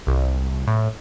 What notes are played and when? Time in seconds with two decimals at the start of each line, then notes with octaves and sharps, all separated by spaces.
0.07 C2
0.67 A2